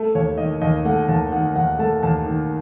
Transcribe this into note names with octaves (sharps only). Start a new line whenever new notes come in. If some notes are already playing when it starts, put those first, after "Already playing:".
Already playing: A3
D#2 C#5
D#3 D#5
D#2 D#5
A3 F#5
D#2 A5
D#3 F#5
D#2 F#5
A3 A5
D#2 A5
D#3